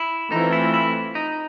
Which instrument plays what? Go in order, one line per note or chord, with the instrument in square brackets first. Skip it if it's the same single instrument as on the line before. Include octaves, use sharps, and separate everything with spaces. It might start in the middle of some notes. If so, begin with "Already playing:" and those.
Already playing: [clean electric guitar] E4
[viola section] E3 A3 C4 F4 [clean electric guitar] D#4
[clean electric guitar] E4
E4
D#4